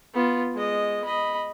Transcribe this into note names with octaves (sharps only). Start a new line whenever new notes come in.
B3 F4
G#3 D#5
D#5 B5